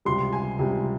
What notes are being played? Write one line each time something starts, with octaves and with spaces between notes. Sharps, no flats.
C#2 C3 G3 C6
G#5
C#2 C3 G3